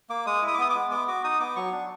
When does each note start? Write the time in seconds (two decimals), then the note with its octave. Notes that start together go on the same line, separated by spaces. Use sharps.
0.09 A#3 D6
0.26 G#3 D#6
0.42 E4
0.48 D#6
0.54 D6
0.58 B3 D#6
0.70 D6
0.75 G#3
0.91 B3 D6
1.08 F#4 D6
1.24 D#4 D#6
1.40 B3 D6
1.56 F#3 C#6
1.72 D4